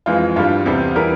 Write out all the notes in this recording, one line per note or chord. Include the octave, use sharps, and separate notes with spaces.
F2 E3 G#3 F4
G2 G3 F4
E2 C3 G3
E3 G3 A#4